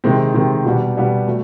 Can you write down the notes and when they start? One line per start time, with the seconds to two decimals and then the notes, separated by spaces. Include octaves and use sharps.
0.04 C3 D#3 G#3 C4
0.34 C3 D#3 G#3 C4
0.65 B2 G3 B3 D4
0.96 B2 G3 B3 D4
1.27 F#3 A3